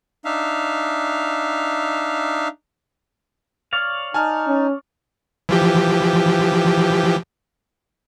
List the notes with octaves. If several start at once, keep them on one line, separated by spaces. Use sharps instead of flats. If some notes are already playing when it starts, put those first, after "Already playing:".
D4 D#4 E5 F5
C#5 D5 F5
D#4 G#5 A5 F6
C#4
E3 F3 G4